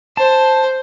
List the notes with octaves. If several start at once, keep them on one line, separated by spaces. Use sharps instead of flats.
C5 A5